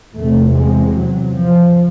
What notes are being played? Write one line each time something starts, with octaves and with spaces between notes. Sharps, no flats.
E2 C3 A3
G#3
F#3
F3